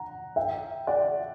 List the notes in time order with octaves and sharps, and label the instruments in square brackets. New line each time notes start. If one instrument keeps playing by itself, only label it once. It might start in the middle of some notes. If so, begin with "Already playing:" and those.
Already playing: [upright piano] F#5 A#5
E5 G5
D5 F#5